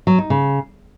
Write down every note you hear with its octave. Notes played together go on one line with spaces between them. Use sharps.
F#3
D#4
C#3